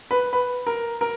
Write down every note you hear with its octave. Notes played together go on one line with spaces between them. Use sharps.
B4
B4
A#4
A#4